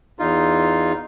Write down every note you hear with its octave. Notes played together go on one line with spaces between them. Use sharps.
E2 D#4 F4